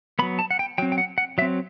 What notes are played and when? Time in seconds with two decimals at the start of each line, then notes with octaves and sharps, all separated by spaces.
0.19 B3 B5
0.22 F#3
0.39 A5
0.51 F#5
0.59 G5
0.78 F#3 C4 G5
0.92 G5
0.98 F#5
1.18 F#5
1.38 F#3 E5
1.42 C4